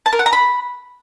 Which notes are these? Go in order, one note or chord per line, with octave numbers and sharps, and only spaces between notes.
A5
A#4
F#5
A#5
B5